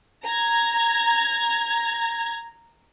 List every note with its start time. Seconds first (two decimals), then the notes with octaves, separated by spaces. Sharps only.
0.24 A#5 G#6